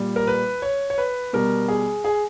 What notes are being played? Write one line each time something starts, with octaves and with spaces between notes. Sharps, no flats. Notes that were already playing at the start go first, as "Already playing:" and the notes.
Already playing: A#2 G3
A#4
B4
C#5
C#5
B4
B2 G3 A#4
G#4
G#4